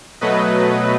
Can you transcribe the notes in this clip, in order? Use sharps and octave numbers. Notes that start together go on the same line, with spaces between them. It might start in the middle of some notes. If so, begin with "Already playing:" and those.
B2 F#3 A3 B4 D#5